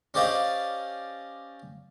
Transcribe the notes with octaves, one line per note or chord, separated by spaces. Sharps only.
C#4 G4 C5 D5 D#5 F5